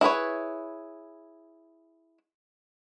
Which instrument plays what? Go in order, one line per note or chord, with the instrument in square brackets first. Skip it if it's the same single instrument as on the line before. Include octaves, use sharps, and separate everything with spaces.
[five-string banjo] E4 G#4 B4 C#5